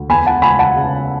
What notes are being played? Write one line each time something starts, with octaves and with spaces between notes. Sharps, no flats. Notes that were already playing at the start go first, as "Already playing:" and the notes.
Already playing: D2
E2 G#5 B5
F#5 A5
C#3 G#5 B5
F#5 A5
C#3